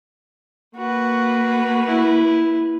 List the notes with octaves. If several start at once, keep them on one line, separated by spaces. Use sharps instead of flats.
A#3 F#4 B4
E4